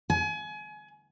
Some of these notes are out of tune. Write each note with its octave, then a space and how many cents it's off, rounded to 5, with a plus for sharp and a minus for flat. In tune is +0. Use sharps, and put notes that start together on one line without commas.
G#5 +30